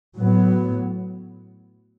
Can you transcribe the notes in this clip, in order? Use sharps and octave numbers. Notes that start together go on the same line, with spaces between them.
A2 F#3 B3